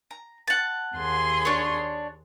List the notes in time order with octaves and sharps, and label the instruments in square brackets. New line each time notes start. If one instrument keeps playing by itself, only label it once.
[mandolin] A#5
F#5 A5
[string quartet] D#2 G#4 C6
[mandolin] D4 C#5